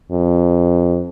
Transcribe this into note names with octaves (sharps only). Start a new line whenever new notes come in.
F2